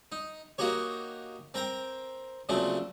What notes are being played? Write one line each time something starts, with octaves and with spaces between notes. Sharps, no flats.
D#4
A#3 D#4 F#4 G4 C#5
C4 A#4 G5 A#5
A#2 C#3 F#3 A3 C4